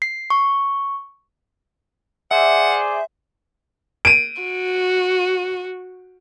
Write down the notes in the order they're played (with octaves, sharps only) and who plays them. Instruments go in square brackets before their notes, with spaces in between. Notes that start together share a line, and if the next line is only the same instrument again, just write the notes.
[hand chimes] C7
C#6
[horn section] G#4 C5 D5 [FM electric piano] E5 [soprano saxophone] F#5
[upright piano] D7 D#7
[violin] F#4